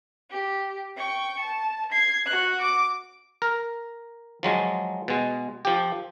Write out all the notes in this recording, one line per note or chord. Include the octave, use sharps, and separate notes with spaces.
G4
G5 C#6
A5
G#6 C7
F#4 F#6
D6
A#4
F3 F#3 G#3
B2 G#3
F3 G4